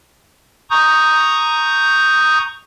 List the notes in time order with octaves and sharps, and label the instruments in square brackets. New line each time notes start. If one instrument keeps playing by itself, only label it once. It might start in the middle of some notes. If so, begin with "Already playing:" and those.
[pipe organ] A#5 C#6 D#6 G6